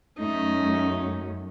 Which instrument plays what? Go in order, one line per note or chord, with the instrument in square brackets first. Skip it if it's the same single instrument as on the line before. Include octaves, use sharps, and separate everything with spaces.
[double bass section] F#2 [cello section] A3 C#4 [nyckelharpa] D#4